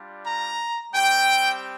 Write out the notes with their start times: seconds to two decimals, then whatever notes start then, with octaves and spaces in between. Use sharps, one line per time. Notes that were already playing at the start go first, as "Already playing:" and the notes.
Already playing: G3 D4 F4
0.26 A#5
0.92 G3 C4 G4 G5